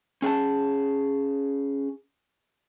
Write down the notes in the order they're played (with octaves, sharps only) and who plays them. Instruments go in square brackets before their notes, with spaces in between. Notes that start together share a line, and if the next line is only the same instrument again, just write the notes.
[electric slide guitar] C#4 G#4 G5 A5